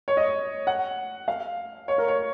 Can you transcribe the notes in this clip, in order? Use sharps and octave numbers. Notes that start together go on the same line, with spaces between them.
C#5
D#5
F#5
F5
C#5
A#4
C#5